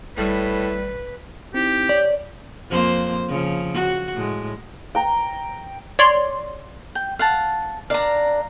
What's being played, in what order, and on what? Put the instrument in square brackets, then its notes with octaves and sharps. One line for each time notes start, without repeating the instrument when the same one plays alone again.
[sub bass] G#1 [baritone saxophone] A2 [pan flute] G3 [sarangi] B4
[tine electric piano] C4 D#4 E4 [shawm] G4
[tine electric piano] C#5 [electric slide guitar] D5
[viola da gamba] F2 A#3 C5
C#3 F3
F#4
A2 G#3
[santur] G5 A#5
[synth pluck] C#5 D5 C6
[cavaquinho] G5
F5 F#5 A5
[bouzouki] D4 A#4 D5 [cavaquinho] F5 A#5